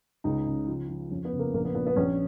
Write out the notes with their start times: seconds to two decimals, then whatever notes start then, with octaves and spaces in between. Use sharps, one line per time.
0.24 C#2 D#4
0.46 C#3
0.68 F3
0.89 F3
1.10 F2 C#4
1.25 B3
1.33 C#3
1.39 A#3
1.54 A#1 A#3
1.65 B3
1.75 A#2 B3
1.86 B3
1.96 A#1 C#4